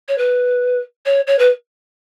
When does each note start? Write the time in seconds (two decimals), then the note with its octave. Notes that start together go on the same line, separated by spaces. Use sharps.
0.08 C#5
0.18 B4
1.06 C#5
1.27 C#5
1.39 B4